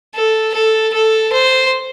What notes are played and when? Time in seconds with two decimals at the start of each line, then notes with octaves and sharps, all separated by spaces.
0.15 A4
0.54 A4
0.93 A4
1.32 C5